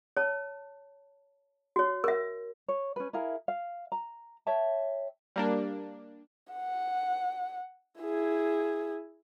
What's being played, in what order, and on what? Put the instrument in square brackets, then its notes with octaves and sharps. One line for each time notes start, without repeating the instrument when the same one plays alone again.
[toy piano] C#5 A5
F#4 C#5
A#4 E5
[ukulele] C#5
C#4 B4
E4 G#4 A#4 F5
F5
A#5
C#5 E5 G5 A5
[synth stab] G3 A#3 D4
[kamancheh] F#5
E4 G#4